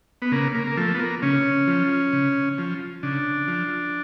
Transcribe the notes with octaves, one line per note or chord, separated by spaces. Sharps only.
B3
C#3 A#3
A#3
A#3
F3 A3
B3
A#3
C#3 C#4
F3
C#3
F3
C#3 D4
F3